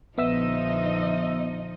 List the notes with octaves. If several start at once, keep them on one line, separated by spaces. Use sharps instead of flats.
A#1 D3 F3 B3 D#4 D#5 E5 E6